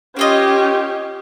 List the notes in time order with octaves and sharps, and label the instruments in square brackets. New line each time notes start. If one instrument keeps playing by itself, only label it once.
[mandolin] A#3 F4 D#5 [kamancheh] C#4 G4